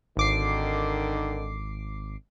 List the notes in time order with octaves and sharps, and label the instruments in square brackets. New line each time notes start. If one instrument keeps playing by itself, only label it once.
[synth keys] G#1 D6 C7 [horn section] D3 D#3